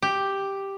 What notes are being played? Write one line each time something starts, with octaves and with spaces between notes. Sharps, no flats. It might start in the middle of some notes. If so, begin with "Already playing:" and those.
G4